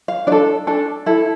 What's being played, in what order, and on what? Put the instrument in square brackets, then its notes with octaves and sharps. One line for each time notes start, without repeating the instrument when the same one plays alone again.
[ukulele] F5
D4 D5
A4
D4 A4
E4 A4